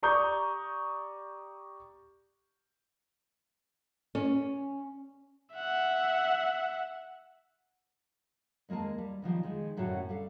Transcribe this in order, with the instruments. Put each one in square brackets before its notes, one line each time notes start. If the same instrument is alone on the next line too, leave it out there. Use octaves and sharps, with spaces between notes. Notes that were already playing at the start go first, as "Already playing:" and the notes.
[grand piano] G4 D5 A#5 C#6 D#6 G6
[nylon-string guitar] C#4
[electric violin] E5 F#5
[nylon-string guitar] D#2 G#3 A#3 A#4 A5
G3
B2 D#3 F3 G3
D#3 G#3
F#2 A2 D3 F#3 F#4
G3 A4 F5